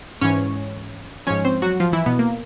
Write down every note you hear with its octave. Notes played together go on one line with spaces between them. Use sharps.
G#2 E3 C#4 C#5
G#2 F3 C#4 C#5
C4 C5
F#3 F#4
F3 F4
E3 E4
B2 B3
A#3